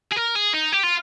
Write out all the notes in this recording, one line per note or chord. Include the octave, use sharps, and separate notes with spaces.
G#4
A#4
G#4
D#4
G4
F4